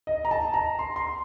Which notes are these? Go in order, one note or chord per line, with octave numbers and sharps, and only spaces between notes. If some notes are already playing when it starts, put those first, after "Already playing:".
D#5
A#5
A5
A#5
C6
C6